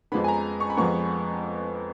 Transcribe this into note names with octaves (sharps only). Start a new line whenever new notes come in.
F2 F3 G#3 B3 B5
G#5
A#5
C#6
B5
F2 F3 G#3 B3 C#6